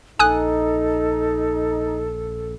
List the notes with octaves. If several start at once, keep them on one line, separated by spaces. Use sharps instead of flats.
A#1 D#4 A4 G#5 D#6 F#6